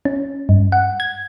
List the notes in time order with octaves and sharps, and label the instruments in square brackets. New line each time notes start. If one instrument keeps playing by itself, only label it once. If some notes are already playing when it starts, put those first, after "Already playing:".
[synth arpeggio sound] C#4
G2
F#5
G#6